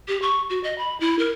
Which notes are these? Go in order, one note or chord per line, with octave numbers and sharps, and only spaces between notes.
G4
C#6
F#4
D#5
B5
E4
A#4